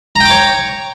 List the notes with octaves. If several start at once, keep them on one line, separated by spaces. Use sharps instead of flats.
C#5 G5 A#5 D6